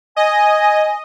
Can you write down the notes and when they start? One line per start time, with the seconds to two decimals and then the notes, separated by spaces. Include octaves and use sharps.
0.16 D#5 G#5